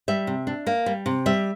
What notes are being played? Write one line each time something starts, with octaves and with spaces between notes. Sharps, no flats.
G3 E5
C3
D4
A#3
G3
C3
G3 E5